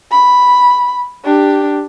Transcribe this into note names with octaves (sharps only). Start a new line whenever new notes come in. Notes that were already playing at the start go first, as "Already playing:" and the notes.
B5
D4 G4